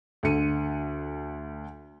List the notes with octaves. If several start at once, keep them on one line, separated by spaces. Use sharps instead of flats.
D2 D3 C#7 D#7